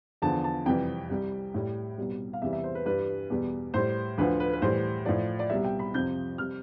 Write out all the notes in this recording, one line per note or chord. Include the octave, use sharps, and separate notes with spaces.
E2 D3 F3 A5
A5
F2 C3 E3 G3 G5
C2 C3 G3
A2 G3
C2 B2 G3
F5
E2 C3 E3 G3 E5
E5
C5
B4
G2 E3 G3 B4
E2 B2 G3
A2 G3 C5
D2 D3 F3 B4
B4
B4
A2 E3 G3 C5
A2 F3 D5
D5
C2 B2 G3 E5
G5
B5
F2 C3 F3 G6
C3 G3 F6